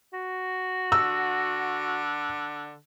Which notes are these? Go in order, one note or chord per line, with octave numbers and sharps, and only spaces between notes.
F#4
D3 E6